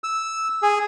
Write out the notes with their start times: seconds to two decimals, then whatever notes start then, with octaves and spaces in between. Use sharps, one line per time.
0.04 E6
0.63 G#4